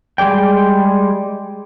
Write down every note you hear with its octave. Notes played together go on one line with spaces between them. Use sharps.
G3 G#3 G#4 D5 G5